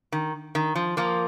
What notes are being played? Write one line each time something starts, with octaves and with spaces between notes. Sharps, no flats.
D#3
D#3
F3
F3 A#3